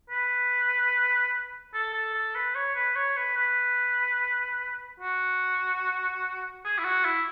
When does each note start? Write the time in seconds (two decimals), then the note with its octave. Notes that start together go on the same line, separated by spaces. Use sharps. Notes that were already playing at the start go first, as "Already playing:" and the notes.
0.10 B4
1.73 A4
1.93 A4
2.14 A4
2.35 B4
2.55 C#5
2.75 B4
2.96 C#5
3.17 B4
3.36 B4
5.00 F#4
6.64 G#4
6.78 E4
6.84 F#4
7.05 E4